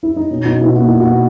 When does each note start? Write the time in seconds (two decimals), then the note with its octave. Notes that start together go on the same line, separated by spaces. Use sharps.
0.03 E4
0.16 D#4
0.31 B2 C#4
0.45 B2 D#4
0.61 B2 E4
0.76 A#3 F#4
0.88 B2 E4
1.00 F#4
1.06 B2